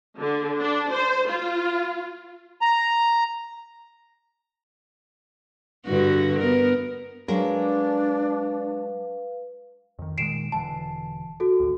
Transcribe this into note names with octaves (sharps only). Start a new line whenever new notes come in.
D3
D4
C5
F4
A#5
G2 D3 F#4
B3 A#4
F#3 G#3 D4 A#4 B4 F5
F2 D#3
A#2 D#3 G#3 C7 D7 E7
E1 D3 E3 A5
F#4 A4
G#1 D2